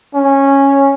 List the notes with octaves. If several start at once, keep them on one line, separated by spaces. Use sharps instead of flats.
C#4